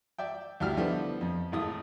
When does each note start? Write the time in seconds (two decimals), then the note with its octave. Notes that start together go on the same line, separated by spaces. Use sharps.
0.18 D5 E5 G5
0.60 D2 G3 E4 F#4 G4 F6
0.77 D3 F3 G3 A3 B3 E4
1.21 F2
1.52 G#1 A2 D#6